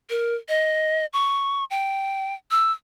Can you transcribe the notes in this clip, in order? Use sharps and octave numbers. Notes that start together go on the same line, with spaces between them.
A#4
D#5
C#6
G5
E6